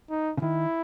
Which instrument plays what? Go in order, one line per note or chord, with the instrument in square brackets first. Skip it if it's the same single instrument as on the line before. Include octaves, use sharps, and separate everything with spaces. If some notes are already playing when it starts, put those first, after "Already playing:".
[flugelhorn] D#4
[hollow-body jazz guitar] C#3
[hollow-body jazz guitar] D#3 [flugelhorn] E4